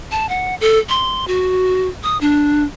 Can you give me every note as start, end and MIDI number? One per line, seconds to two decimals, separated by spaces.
0.12 0.29 81
0.29 0.55 78
0.61 0.79 69
0.89 1.25 84
1.28 1.88 66
2.03 2.19 87
2.21 2.65 62